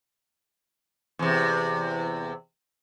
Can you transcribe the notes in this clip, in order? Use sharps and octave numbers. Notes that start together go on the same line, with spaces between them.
E2 C3